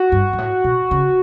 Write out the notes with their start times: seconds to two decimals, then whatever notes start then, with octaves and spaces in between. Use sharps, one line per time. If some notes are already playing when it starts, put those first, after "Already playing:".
Already playing: F#4
0.12 G2
0.33 G2
0.38 A2
0.64 B2
0.91 C#3